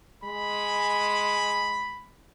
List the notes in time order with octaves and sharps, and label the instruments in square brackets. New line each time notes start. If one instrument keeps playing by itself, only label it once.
[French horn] G#3 [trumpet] B5